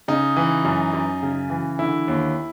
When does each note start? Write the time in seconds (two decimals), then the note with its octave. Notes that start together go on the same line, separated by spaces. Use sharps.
0.08 C#3 D#4
0.37 E3
0.65 F#2
0.93 F#2
1.23 C#3
1.50 E3
1.79 D3 E4
2.08 D#2